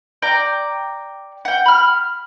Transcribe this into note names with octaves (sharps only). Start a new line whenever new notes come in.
D5 G5 A#5
F#5 G5
B5 F6